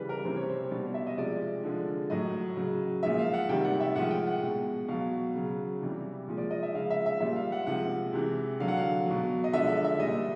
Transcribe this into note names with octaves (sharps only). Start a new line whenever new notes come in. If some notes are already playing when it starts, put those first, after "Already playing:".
Already playing: C#3 E3 G3 B4
A#4
C3 E3 G3 C5
C#5
C5
B2 G3
E5
D#5
C3 F3 G#3 D5
D3 F3 G#3
A2 F#3 D#5
C#3 F#3
A#2 F3 G#3 E5
F5
F#5
C3 D#3 G3 G5
F#5
E5
A2 F3 G#3 F#5
G5
F#5
B2 G#3
B2 F#3 F5
C#3 F#3
C3 E3 G3
A#2 F3 G#3
D5
D#5
E5
C#3 F3 G#3 F5
E5
E5
A#2 G3 E5
F5
F#5
C3 F3 G#3 F#5
C3 E3 G#3
D3 F#3 F5
F#5
F5
B2 F#3
D#5
D3 F3 G#3 E5
E5
E5
A#2 G3 D#5